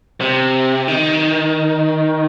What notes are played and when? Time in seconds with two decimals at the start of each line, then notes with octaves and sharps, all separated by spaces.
0.21 C3
0.88 D#3